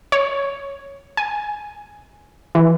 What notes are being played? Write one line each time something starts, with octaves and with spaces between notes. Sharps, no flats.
C#5
G#5
E3